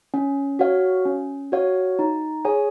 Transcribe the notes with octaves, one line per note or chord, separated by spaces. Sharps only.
C#4
F#4 C#5 F5
C#4
F#4 C#5 F5
D#4
G#4 C#5 G#5